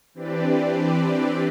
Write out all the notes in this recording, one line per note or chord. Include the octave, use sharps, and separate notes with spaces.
E3 C4 D4 G4 B4 D5